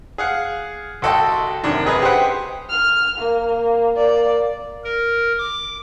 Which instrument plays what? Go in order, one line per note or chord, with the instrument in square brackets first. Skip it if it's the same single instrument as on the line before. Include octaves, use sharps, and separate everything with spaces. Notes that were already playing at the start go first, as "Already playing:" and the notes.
[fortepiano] G#4 F5 F#5
C2 F#4 A4 D#5 G5 C6
F#2 C3 D#3 D4
F#2 C3 G#4 B4 D#5 A#5
G4 G#4 B4 C5 F#5 G5
[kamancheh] F6
A#3
A#3 D5
[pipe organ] A#4
D6